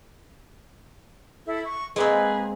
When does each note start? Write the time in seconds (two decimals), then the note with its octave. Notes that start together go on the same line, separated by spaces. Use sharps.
1.46 E4 A4
1.64 C#6
1.96 G#3 A#3 C4 G#4 B4